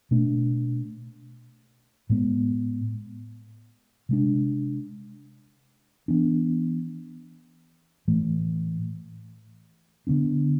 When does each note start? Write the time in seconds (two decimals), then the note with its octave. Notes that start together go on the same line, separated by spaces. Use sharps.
0.11 B2 A3 D4
2.10 A2 G#3 B3
4.09 C3 G#3 D4
6.08 E3 B3 D4
8.08 A2 E3 A3
10.07 D3 F3 B3 D4